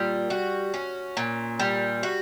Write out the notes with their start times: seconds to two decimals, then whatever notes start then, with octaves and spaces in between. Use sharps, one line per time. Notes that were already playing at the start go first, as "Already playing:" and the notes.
Already playing: A#2 G3
0.30 F#4
0.74 C#4
1.17 A#2
1.60 G3
2.03 F#4